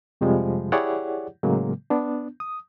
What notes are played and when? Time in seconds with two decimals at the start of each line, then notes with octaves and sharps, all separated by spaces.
0.21 F2 C3 F3 G3 G#3
0.72 E4 G4 G#4 C#5 D5 F#5
1.43 A2 C#3 F#3 G#3 A#3
1.90 B3 D4
2.40 D#6